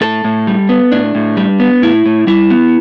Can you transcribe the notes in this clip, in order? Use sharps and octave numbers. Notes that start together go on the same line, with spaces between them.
A2 A4
A2
G3
B3
A2 D4
A2
G3
B3
A2 E4
A2
G3 E4
B3